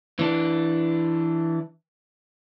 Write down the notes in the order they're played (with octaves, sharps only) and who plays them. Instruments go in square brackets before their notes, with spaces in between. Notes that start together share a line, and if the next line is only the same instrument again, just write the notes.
[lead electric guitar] E3 D4